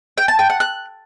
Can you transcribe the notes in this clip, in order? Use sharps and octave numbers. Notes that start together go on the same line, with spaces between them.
G5
A5
G5
F#5
F#6